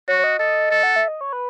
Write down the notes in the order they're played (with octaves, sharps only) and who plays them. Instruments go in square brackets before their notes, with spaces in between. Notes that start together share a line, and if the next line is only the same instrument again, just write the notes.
[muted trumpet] F#4 [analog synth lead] C#5
[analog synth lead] C#5
D#5
[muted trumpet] A4 [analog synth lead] D#5
[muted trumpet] A4
[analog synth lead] F#5
E5
D#5
C#5
B4